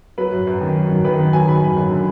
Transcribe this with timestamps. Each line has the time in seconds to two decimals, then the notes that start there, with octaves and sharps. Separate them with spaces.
0.18 F#3 B4
0.32 F#2
0.47 F#2
0.61 D#3
0.76 F#3
0.90 F#2
1.05 D#3 B4
1.19 D#3
1.33 F#3 G#5
1.48 D#3 B5
1.63 F#2
1.77 F#2
1.91 D3